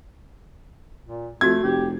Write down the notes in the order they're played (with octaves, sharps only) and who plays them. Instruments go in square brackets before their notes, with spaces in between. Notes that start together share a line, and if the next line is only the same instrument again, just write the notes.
[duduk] A#2
[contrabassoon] F2 [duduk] A3 [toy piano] F#4 E6 [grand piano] G#6
[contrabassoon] F1 [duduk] G4